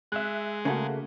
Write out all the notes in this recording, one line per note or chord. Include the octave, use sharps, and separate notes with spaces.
G#3 E5 F#6
C#3 A3 A#3 F#4